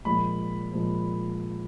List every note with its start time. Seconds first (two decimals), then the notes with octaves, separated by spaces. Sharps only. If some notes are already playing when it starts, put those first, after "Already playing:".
0.05 A#2 F3 G#3 B5
0.72 A#2 F3 G#3